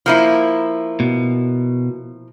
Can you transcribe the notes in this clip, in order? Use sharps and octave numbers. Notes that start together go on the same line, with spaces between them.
F3 A#3 E4
B2